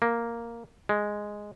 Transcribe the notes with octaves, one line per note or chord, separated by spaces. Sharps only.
A#3
G#3